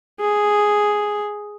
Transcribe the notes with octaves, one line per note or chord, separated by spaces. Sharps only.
G#4